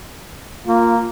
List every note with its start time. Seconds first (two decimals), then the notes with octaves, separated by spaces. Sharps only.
0.66 A#3 F4